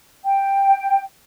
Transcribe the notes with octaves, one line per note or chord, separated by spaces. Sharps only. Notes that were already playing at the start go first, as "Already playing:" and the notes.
G5